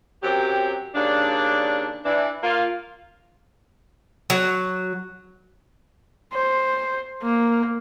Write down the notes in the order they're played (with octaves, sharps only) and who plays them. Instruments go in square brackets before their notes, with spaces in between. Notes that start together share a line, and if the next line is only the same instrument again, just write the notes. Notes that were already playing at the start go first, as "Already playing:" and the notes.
[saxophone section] F#2 F#3 C4 G4
D#2 C#3 D4
E3 D4
A#3 F4
[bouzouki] F#3
[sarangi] C5
A#3